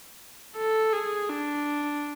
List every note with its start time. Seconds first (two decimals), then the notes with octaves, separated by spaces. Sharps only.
0.57 A4
0.93 G#4
1.29 D4